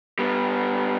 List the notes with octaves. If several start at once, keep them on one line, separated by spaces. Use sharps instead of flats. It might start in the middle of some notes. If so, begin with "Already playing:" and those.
G3 B3